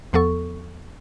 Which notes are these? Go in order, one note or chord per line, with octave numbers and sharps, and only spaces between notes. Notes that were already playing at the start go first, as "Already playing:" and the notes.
E2 F3 B3 A4 C#6